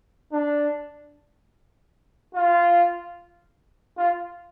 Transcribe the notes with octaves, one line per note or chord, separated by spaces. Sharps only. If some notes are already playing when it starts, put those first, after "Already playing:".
D4
F4
F4